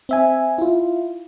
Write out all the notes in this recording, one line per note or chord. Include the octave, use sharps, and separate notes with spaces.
C4 E5 G#5
E4 F4